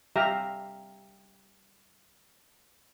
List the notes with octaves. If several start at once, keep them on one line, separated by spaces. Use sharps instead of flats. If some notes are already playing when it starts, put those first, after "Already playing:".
G3 G4 E5 F5 A#5